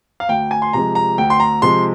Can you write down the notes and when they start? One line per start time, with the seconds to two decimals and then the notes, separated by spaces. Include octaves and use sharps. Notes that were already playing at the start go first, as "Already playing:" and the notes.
0.20 F5
0.29 D2 G5
0.51 G#5
0.62 C6
0.73 C3 F3 G#3 A#5
0.95 A#5
1.18 D2 G5
1.30 C6
1.40 A#5
1.62 C3 F3 G#3 C6